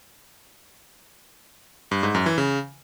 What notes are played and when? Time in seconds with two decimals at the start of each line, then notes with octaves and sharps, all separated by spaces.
1.91 G2
2.03 G#2
2.15 F#2
2.26 E3
2.38 C#3